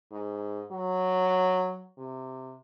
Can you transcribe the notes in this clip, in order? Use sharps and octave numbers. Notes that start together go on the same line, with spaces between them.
G#2
F#3
C3